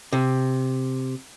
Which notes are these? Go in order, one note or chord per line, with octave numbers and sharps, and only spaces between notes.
C3